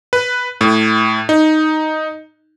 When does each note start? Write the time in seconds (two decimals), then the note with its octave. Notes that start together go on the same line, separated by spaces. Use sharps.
0.13 B4
0.61 A2
1.29 D#4